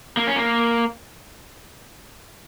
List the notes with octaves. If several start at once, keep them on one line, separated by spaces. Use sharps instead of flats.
A#3
C#4
A#3